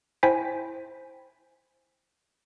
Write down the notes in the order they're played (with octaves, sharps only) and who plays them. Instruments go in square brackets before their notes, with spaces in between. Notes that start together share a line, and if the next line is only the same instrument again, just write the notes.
[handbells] E4 C5 G5 G#5 B6